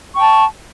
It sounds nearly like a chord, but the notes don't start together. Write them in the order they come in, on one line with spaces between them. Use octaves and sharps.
C#6 G5 A5